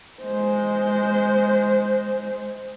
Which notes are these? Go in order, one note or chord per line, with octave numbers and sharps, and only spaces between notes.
G#3 C5